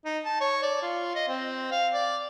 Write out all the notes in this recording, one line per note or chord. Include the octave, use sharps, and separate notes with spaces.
D#4
A5
C#5
D5
F4
D#5
C4
F5
D5